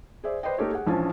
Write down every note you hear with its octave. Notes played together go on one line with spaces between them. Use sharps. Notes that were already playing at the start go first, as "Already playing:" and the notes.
G#4 C5 D5 E5
B4 C5 D5 D#5 G5
A#3 D#4 G4 A4 C#5
G#4 F#5
A#1 E3 F3 C#4 G#5 A5